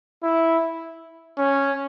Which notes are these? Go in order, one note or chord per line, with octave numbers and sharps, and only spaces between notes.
E4
C#4